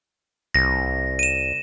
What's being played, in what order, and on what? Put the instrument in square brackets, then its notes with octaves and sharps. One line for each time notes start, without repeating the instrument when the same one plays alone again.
[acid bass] C2 [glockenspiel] A#6
[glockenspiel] D#7 E7